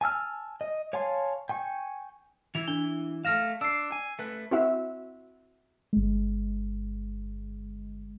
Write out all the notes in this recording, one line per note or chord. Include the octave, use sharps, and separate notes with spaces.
G#5 A5 E6 F6
D#5
C#5 F5 G#5 A5 C6
G5 G#5 C#6
E3 E4 F7
D4 G7
A3 F5 F6 A#6 E7
D4 E6 C7
G#5
A3 B4
C4 E4 F#4 E5
G1 G#3